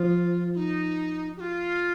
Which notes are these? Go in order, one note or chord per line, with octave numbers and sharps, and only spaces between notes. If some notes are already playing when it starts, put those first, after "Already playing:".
Already playing: F3 F4
F4
D#4
G4
F4